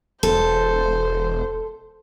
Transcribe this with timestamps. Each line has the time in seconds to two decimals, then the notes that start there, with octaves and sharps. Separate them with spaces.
0.23 E1 A4 C5